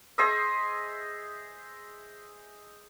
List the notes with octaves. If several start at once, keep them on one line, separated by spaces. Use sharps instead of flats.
G#4 C5 D#5 E5